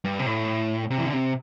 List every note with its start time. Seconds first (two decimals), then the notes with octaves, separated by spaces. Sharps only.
0.04 G2
0.19 C3
0.26 A2
0.90 C3
0.98 E3
1.06 D3
1.13 C3